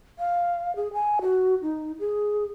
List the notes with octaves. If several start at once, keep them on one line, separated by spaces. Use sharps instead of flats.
F5
G#4
G#5
F#4
D#4
G#4